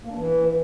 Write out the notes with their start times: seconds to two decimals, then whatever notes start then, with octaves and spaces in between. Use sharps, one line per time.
0.05 A#3
0.10 D4
0.16 E3